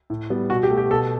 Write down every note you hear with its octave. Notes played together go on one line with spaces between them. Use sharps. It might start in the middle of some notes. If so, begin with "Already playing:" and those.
A2
G3 B3
B2 F#4
G4
A3
G4
B2 A4